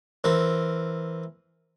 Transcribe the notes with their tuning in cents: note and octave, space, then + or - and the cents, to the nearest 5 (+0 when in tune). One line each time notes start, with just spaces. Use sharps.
E3 +0 C4 +0 A#4 +0